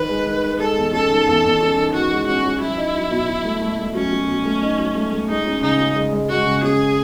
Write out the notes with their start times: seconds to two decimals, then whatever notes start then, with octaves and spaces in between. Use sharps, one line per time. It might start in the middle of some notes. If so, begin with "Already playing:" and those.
Already playing: D#3 B4
0.09 G#3
0.27 D#3
0.43 D#3
0.59 G#3 A4
0.77 E2
0.93 C#4 A4
1.10 D#3
1.27 E2
1.44 E2
1.60 C#4
1.77 D#3
1.93 D#3 F#4
2.11 G#3
2.27 C#4 F#4
2.44 C#4
2.61 F#3 E4
2.77 D#4
2.95 F#3
3.11 B2
3.27 B2
3.45 A3
3.61 A3
3.79 A3
3.95 F#3 C#4
4.12 F#3
4.28 B2
4.45 A3
4.62 D#4
4.79 F#3
4.95 A3
5.13 A3
5.29 G#3 D#4
5.46 C#4
5.62 C#3 D#4
5.80 C#4
5.96 G#3
6.13 G#3
6.29 G#3 F#4
6.46 C#3
6.62 C#4 G#4